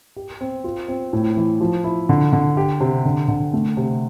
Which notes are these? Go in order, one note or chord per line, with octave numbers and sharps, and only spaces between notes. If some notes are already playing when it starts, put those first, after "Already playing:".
G4
C4
F4
C4
A2
E3
F3
E4
D3
D3
G4
C3
D3
D3
A3
C3